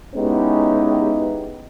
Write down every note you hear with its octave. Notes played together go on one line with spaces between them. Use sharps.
G#3 B3 C#4 D#4 E4 G4